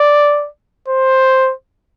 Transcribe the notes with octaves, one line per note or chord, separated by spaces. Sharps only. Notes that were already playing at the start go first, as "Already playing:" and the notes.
Already playing: D5
C5